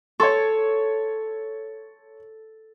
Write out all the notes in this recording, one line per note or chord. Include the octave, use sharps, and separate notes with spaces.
A4 C#5 C6 C#6